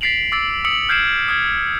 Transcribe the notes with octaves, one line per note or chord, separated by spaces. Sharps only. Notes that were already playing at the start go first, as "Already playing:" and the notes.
A6 B6 C7 D7 F7 F#7
D6 E6 A6 D7
D#6 E6 B6 C#7 D7 F#7
F6 G6 G#6 C7 D7 E7
D#6 F6 G#6